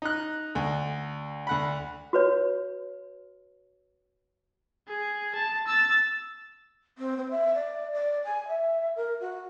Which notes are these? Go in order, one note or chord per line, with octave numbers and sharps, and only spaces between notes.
D#4 F#6
D2
D2 F#5 B5
F#4 B4 C#5
G#4
A5
E6 A6
C4
C4
E5
D5
D5
G#5
E5
A#4
F#4